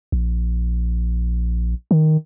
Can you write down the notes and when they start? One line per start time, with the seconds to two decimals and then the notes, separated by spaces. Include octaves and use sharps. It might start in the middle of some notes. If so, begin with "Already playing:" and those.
0.12 A#1
1.91 D#3